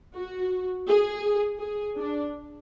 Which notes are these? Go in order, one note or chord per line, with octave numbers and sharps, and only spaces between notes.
F#4
G#4
G#4
D4